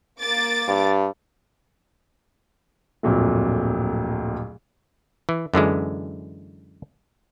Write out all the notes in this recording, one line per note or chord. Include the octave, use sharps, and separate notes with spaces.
A#3 D6 A6
G2
D1 F2 A#2 F#3 A3
E3
F#2 D3 E3 G#3